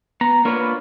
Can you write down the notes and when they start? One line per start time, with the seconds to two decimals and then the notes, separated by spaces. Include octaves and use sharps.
0.21 B3 A#5
0.45 A#3 D4 F4 B4 C#5